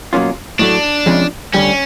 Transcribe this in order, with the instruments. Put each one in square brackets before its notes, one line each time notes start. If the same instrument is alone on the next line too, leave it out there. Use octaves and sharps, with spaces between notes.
[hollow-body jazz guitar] B2 F#3 A#3 C#4 F4
[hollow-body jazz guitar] A2 F#3 A3 [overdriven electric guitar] D4
[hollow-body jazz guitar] F2 C3 F3 G#3 C#4
[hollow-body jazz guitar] D2 D3 G3 [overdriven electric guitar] C#4